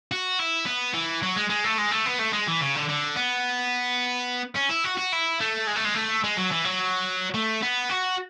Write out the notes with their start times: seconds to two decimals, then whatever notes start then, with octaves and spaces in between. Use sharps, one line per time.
0.11 F#4
0.39 E4
0.66 B3
0.94 E3
1.23 F#3
1.36 G#3
1.49 G#3
1.64 A3
1.78 G#3
1.91 A3
2.06 B3
2.19 A3
2.33 G#3
2.48 E3
2.61 C#3
2.76 D3
2.89 D3
3.16 B3
4.56 C#4
4.69 E4
4.84 F#4
4.97 F#4
5.12 E4
5.40 A3
5.67 G#3
5.76 A3
5.85 G#3
5.95 A3
6.24 G#3
6.37 F#3
6.51 E3
6.64 F#3
7.34 A3
7.62 B3
7.89 F#4